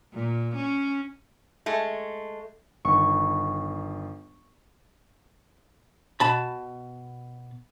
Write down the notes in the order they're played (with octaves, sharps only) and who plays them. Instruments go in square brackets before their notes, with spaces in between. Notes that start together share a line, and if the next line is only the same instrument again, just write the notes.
[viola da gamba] A#2
C#4
[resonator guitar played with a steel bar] G#3 A3
[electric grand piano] G1 D#3 [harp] C#6
[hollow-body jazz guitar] B2 A5 B5